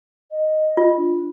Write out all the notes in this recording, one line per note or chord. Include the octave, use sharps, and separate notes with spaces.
D#5
F4
D4